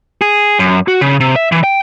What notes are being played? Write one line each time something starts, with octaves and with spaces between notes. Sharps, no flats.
G#4
F#2
F#4
C#3
C3
E5
E3
G5